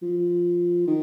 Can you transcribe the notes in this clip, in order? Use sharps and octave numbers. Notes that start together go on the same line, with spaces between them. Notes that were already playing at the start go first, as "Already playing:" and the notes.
F3
D#3